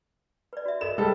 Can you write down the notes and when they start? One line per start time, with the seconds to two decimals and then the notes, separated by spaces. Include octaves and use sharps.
0.53 B4 D5
0.66 F#4 E5
0.81 A4 A#4 D#5 E7
0.98 G3 G#3 A4 B4 F5 G5